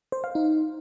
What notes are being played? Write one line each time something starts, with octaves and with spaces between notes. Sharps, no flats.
C5
F5
D#4